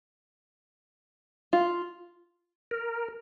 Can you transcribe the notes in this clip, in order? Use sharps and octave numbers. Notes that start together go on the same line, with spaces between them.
F4
A#4